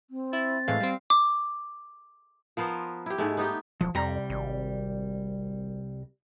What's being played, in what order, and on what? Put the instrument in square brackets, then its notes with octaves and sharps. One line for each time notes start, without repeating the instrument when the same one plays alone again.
[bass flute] C4
[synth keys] E4 [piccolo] A6
[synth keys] A2 E3 G#3 [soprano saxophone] F5
[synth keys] G3 C4
[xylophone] D6
[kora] F3 B3 A#4 C5
E4 G4
G#2 G#3 A3
B3 D#4 G4 G5
[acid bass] E1 [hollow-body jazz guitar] F3
[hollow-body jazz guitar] C2 G3 A#5 [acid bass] F2
[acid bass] G#1